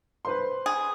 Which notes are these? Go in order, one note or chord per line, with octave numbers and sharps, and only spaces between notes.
B4 C5 C6
G#4